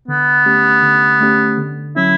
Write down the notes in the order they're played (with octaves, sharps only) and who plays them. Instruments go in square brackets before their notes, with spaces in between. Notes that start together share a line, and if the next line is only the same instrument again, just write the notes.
[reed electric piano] D3 [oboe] B3
[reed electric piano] A3 C#4 G4
D3
A3 C#4 G4
D3
[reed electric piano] F#3 C#4 [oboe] E4